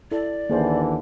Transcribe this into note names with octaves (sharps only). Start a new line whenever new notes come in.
E4 A4 D5
D#2 D3 E3 A#3 G#4 C5